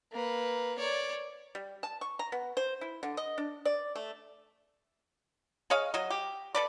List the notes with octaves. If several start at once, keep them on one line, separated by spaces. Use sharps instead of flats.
A#3 B4
C#5 D5
G3
A5
C#6
A#5
B3
C5
E4
D3
D#5
D4
D5
A3
G#4 C#5 D#5 F5
F#3 D#5
G4
A4 B4 D5